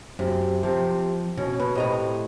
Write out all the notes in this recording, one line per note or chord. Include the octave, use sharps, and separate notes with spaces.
F#2 C3
C3 F3
B2 C#4
B2 B4
A2 C3 D#5 A#5